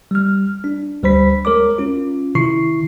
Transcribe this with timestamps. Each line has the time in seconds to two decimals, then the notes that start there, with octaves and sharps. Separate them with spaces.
0.11 G3 F6
0.64 D4
1.03 D2 G3 C5 B5 B6
1.45 G#3 A#4 C#5 D6
1.78 C#4 F4
2.35 C3 D#3 E4 C#6 C7